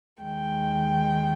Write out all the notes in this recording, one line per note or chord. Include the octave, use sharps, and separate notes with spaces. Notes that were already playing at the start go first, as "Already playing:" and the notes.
D#2 D#3 G#3 G5